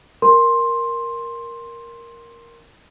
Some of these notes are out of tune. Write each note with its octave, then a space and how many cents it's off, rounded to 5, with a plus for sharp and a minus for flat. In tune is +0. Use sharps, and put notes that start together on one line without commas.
A#4 +5 C6 +10